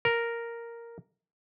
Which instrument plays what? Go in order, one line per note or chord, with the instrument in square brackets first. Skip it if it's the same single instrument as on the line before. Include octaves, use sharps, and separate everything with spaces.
[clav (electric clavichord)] A#4